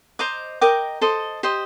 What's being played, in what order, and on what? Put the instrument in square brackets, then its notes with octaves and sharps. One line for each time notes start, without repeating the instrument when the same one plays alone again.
[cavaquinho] C5 D#5 A#5 D6
A#4 D#5 G5 D6
A4 C5 D#5
G4 C5 D#5